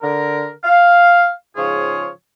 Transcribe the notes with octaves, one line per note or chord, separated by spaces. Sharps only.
D3 A#4
F5
G#2 C#3 F3 F4 G#4 C#5